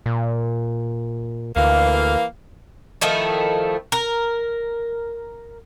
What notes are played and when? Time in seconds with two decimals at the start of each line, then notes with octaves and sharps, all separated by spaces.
0.06 A#2
1.56 D2 E3 A#3 F5
3.01 D#3 F3 A3 E4
3.92 A#4